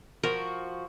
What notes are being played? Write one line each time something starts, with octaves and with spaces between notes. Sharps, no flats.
F3 F#4 A#4